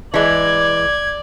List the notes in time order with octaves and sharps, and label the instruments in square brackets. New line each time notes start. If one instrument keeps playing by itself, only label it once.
[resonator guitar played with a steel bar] E3 G#3 [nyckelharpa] D5 [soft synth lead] G#6